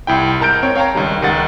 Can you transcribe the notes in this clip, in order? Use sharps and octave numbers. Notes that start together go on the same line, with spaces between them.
C2 E4 G5
G#2 A#4 A5 G6 D7
C4 C#5
C#5 F5 G5 A5 A#5
C#2 D#3 G3
C#2 D#3 G3 F#5 A6